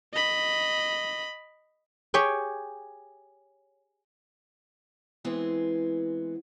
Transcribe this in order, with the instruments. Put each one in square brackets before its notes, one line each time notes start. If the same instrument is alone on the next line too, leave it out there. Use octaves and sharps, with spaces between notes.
[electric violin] D#5 B5
[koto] G4 G#4 C#5 G5
[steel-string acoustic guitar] E3 G#3 B3 C4